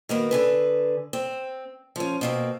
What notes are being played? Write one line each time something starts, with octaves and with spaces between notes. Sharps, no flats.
D#3 A#3 B3 F#4
D3 G#4 B4
C4
F3 C#4
B2 A#3 C4